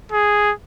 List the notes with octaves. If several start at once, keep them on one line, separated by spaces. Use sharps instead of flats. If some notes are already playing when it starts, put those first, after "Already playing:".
G#4